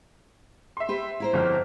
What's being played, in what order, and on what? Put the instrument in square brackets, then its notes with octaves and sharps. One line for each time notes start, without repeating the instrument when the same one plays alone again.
[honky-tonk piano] E5 C6
[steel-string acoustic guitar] G4 B4
E4 A#4 C5
[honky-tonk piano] G1 F2 F6